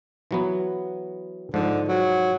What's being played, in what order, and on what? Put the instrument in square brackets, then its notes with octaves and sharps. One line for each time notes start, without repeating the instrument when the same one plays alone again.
[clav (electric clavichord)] E3 F#3 B3
[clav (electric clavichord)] G#2 F3 [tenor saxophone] D3
[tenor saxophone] F#3